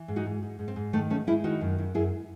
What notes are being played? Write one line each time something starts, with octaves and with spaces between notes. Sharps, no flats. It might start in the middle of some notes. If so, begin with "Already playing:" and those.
Already playing: E3
G#2
D#4 F#4
G#2
G#2
G#2
C4
G#2
D#3 A3
G#2 A3 C#4
G#3 C#4 E4
D#3 D#4 F#4
F#2
F#2
F#2 E4 G#4